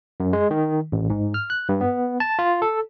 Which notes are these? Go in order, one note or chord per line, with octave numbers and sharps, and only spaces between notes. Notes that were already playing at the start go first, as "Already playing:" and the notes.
F#2
G#3
D#3
A1
G#2
F6
F#6
G2
B3
A5
F4
A4